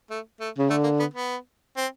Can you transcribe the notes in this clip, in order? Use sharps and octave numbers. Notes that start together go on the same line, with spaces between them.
A3
A3
C#3
D3 A3
A#3
B3
B3
C4